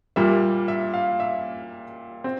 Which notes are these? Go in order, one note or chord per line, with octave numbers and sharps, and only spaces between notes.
A#2 G3 A#3 E5
E5
F5
E5
C4